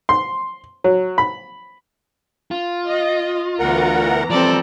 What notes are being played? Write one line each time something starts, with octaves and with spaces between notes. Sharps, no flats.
C6
F#3
B5
F4
D#5
D2 E3 B3 A#4 F#5 A#5
F3 G3 C4 A4 D5